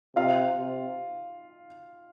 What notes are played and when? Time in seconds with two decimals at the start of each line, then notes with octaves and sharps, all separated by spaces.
0.16 C3 F4 F5
0.58 C3